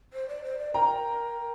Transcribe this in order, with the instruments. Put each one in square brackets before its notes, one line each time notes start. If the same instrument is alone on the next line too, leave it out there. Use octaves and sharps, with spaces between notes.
[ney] C5
D5
C5
D5
[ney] A#4 [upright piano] G5 A#5